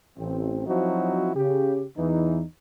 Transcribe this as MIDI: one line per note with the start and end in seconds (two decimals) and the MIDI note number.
0.18 0.66 33
0.18 0.66 60
0.66 1.30 53
0.66 1.30 54
0.66 1.30 60
0.66 1.30 63
0.66 1.30 64
0.66 1.30 66
1.35 1.83 49
1.35 1.83 67
1.97 2.43 40
1.97 2.43 52
1.97 2.43 63